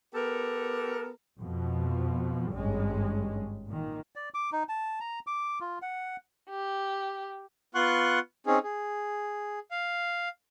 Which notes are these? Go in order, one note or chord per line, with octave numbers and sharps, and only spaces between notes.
B3 G4 A4 A#4
F2 B2 F3
G#1 G2 G3 G#3 C#4
A#2 D#3
D5
D6
D#4
A5
A#5
D6
F4
F#5
G4
B3 F4 F#5 C6 C#6 F#6
C4 C#4 D#4 G#4
G#4
F5